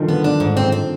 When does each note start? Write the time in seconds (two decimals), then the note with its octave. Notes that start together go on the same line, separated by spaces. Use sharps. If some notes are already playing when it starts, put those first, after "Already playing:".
Already playing: D3 D#3 F3 G3
0.09 B3
0.24 D4
0.40 G#2
0.57 C4
0.72 C4